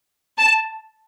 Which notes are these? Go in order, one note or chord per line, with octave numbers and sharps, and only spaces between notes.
A5